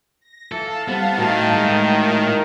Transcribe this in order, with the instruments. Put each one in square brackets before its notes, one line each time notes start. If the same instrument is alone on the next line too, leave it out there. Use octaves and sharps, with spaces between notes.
[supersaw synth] A#6
[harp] E3 [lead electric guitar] A4 [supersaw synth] F5 A5
[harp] G3 C4 [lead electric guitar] B3
[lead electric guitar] A2 [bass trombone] D#3 [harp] F#4
[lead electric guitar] A2 [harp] G#3 [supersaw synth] A#4